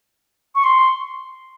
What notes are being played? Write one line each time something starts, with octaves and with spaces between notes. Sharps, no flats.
C#6
C6